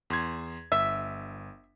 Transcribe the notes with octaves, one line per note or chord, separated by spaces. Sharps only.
E2 C6 G#6
G1 E5 B6